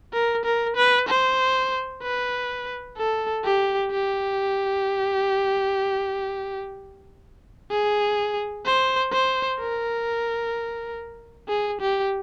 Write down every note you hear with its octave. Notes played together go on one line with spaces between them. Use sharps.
A#4
A#4
B4
C5
B4
A4
G4
G4
G#4
C5
C5
A#4
G#4
G4